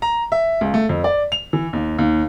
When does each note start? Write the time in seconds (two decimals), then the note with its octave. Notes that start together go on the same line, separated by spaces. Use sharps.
0.02 A#5
0.32 E5
0.61 C#2
0.74 A3
0.89 F2
1.04 D5
1.32 F7
1.53 E3
1.73 D#2
1.98 D#2